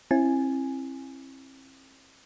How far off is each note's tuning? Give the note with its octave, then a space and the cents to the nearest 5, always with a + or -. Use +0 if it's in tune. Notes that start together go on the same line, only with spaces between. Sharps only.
C4 +45 E4 +10 G#5 +0